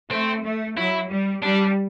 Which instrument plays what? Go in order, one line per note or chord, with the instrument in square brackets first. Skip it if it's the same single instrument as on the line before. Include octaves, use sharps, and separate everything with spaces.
[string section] A3 [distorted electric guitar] C4
[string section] A3
[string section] F#3 [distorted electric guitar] E4
[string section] G3
[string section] G3 [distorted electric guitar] D4